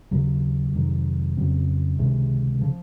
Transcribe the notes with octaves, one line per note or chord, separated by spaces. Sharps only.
D#2 C#3 F#3
F2 C3 D#3 F#3
F2 C#3 F#3 C4
C#2 C3 D#3 G#3
C#3 F3